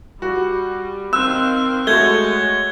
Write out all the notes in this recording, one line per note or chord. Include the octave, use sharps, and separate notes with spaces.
G3 F#4
D#3 C4 F5 E6 F#6
G#3 A3 F#4 C#5 G6 G#6 G7